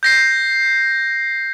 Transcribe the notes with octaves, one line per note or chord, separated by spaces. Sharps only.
G6 A#6 C7